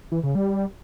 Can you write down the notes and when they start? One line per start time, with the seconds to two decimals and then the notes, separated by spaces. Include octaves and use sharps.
0.12 E3
0.23 C#3
0.35 G3